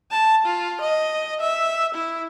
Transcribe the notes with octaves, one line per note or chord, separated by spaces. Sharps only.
A5
F4
D#5
E5
E4